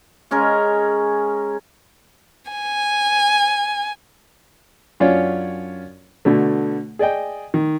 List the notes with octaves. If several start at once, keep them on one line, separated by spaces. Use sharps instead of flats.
G#3 C#4 G#4 A#4
G#5
F#2 C#4 D4 F4 C#5 D5
B2 D3 A3
G#4 D5 D#5 G5
D#3